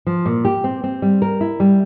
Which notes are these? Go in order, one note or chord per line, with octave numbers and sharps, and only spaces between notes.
F3
A#2
G4
C4
C4
G3
A#4
E4
G3